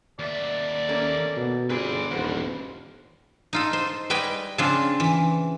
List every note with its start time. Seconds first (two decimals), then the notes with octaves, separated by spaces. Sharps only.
0.19 D#2 D5 E5
0.89 A#3 C#4 A4
1.36 B2
1.70 G1 G3 C4 G#4 B4 D5
2.11 D#1 E2 G2 F#4 C5
3.53 D#4 F4 A4
3.73 C5
4.10 G3 B4 D#5 G5 G#5 B5
4.58 C#3 F3 C4 D4 F4
5.00 E3